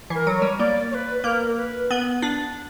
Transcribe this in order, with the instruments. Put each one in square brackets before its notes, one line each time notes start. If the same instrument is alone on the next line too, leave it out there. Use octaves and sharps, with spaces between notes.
[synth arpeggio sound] E3 [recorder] A#4
[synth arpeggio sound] F#3
[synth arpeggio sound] G3 [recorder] C#5
[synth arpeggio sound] A#3 [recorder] D5
[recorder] C#5
B4
[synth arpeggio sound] A#3 [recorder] A#4
[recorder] B4
[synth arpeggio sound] B3
D4